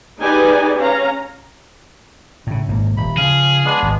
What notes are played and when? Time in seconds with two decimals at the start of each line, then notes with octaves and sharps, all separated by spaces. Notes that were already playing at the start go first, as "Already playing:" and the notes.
0.19 D#4 G4 G#4 B4 D5 G#5
0.79 C#4 F5 A#5
2.47 A2 C#3
2.68 G#1 G#2 A#3
2.97 D#1 B5
3.17 C#3 F3 G#4 F5
3.64 G#3 B3 D4
3.82 G#1